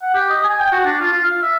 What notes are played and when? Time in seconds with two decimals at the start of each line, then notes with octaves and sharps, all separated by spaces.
0.02 F#5
0.14 G4
0.29 D#5
0.44 G#5
0.60 G5
0.72 F#4
0.84 D4
1.00 F4
1.12 F4
1.24 F5
1.42 E5